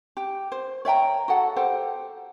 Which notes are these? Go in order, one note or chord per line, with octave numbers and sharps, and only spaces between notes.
G4
C5
C#5 E5 G5 A#5
F#4 G#4 A4 F#5
G4 A4 C5 F#5